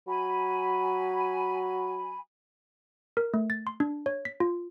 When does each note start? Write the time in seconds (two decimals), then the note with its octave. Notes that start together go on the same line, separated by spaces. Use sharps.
0.07 F#3 G#5 B5
3.17 A#4
3.34 A3
3.50 A6
3.67 C6
3.80 D4
4.06 C#5
4.25 B6
4.40 F4